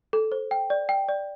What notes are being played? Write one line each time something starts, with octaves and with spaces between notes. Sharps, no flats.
A4
C5
G5
D5
G5
D5